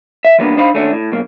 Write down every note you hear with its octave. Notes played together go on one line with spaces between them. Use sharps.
E5
E3 G3 A#3 B3 D4
D4 D#4 C5 F5 B5
D#2 A3 C#4 D4 F#4
A2
B1 A#3